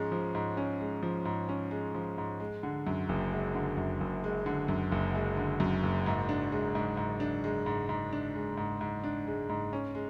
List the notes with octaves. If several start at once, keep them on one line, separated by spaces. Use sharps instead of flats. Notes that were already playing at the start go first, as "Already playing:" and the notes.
Already playing: G#2 F3 G#3 C#4
F3
G#2
C#4
G#3
F3
G#2
C#4
G#3
F3
G#2
G#3
D3
F#2
F#1
G#3
D3
F#2
F#1
G#3
D3
F#2
F#1
G#3
D3
F#2
F#1
G#2
D4
G#3
G#2
G#2
D4
G#3
G#2
G#2
D4
G#3
G#2
G#2
D4
G#3
G#2
C#4
G#3